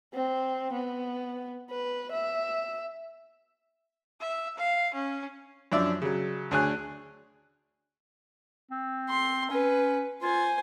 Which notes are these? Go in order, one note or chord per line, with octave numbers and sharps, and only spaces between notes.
C4
B3
B4
E5
E5
F5
C#4
F#2 F3 D4 D5 E5 E6
C#3 F#3
D2 D4 G#4 C#5 G#5 F#6
C4
C6
C#4 B4
F4 C5 G#5